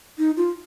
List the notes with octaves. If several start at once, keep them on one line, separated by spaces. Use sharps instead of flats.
D#4
F4